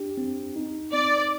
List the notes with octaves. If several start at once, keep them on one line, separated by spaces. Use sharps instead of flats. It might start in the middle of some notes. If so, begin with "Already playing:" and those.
Already playing: D4 G4
C4
D#4
C4 D5